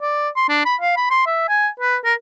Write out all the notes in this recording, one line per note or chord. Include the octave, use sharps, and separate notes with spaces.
D5
C6
D4
B5
F5
B5
C6
E5
G#5
B4
A#4